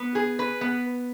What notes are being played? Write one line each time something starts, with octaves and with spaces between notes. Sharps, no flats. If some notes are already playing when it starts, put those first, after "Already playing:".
Already playing: B3
G#4
B4
B3